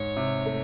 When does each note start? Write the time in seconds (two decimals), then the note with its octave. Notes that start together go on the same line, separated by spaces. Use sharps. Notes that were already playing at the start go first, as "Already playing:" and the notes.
Already playing: G#2 C#5
0.17 C3
0.46 A3